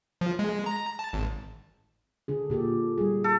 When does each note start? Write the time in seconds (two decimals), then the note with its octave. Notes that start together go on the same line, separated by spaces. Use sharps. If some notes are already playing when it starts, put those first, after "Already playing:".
0.21 F3
0.39 G#3
0.66 A#5
0.99 A5
1.13 G#1
2.28 D3 D4 G#4
2.50 A#2 G4 A4
2.98 G3 G#4
3.24 A4